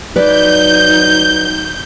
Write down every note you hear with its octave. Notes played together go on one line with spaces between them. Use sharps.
F#3 D#4 B4 D5 G6